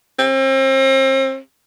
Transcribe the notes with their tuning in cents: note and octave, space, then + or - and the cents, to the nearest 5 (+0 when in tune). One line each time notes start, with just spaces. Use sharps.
C4 +35